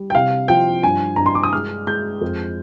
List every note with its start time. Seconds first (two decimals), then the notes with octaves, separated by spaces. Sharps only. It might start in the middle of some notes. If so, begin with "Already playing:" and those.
Already playing: G3
0.10 G5
0.15 C3 F5
0.48 F3 G5
0.83 G2 G#5
1.16 G2 A#5
1.26 C6
1.35 D6
1.43 D#6
1.53 G#3 F6
1.87 G#3 G6
2.21 F2